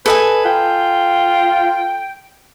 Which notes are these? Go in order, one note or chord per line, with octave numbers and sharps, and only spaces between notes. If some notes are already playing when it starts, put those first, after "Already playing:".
A4 B4 D#5 G#5
F4 G5